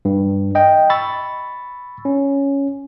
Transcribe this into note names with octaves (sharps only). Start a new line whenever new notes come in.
G2
D#5 G5
B5 C#6 E6 A6
C#4